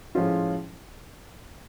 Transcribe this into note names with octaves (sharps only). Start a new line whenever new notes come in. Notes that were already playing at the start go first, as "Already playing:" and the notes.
A2 F3 G#3 C#4 F4